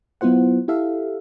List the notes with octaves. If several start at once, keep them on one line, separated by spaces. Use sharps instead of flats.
F#3 B3 E4 F4 C5 F#5
E4 G4 A4 E5 F5